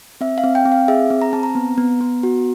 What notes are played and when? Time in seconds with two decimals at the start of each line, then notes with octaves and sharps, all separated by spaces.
0.21 C4 E5
0.38 F5
0.44 C4
0.55 G5
0.66 C4
0.72 F5
0.88 G#4 E5
1.10 C4
1.22 A#5
1.33 C4 A5
1.43 A#5
1.55 B3
1.78 B3
2.01 B3
2.23 F#4